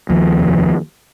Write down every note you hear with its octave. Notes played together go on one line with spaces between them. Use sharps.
D#2 F3
F1